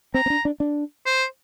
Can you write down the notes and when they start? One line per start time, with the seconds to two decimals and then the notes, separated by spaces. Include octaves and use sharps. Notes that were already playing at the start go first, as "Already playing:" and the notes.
0.14 C4 A#5
0.26 C4
0.30 D4
0.45 D4
0.60 D4
1.06 C5